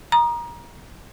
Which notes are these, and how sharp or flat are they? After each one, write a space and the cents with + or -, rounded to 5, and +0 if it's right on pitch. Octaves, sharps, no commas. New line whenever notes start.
A#5 +20 D#6 -25